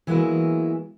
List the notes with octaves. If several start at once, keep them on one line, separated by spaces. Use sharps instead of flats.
E3 F#3 G#3 A#3 B3 E4